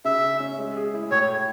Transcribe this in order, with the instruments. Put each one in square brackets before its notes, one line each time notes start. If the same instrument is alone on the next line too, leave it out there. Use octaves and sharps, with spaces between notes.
[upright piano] C#3 [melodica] E5
[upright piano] C#3
C#4
G#3
G#4
E4
[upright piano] A2 [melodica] C#5
[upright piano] A2